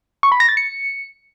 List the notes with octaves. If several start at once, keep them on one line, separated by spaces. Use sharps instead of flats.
C#6
B5
A#6
A6
C#7